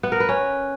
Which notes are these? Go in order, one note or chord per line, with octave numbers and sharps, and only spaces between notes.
B3
A#4
B4
C#4